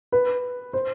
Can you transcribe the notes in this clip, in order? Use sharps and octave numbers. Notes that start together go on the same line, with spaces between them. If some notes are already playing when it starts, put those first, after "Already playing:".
B4
C5